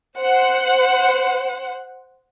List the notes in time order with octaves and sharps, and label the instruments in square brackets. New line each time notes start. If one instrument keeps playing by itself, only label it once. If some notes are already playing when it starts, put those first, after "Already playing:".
[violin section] C5 F#5